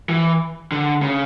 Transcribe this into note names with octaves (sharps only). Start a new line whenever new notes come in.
E3
D3
C#3